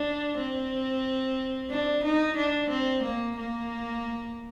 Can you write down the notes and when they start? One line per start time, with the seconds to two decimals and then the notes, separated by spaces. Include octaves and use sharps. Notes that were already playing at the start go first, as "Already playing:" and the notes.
Already playing: D4
0.38 C4
1.70 D4
2.04 D#4
2.36 D4
2.69 C4
3.02 A#3
3.36 A#3